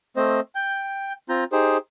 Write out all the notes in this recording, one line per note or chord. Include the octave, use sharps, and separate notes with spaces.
A3 C4 C5 D#5
G5 G6
C4 F4 A#5 G6
D#4 G4 G#4 C5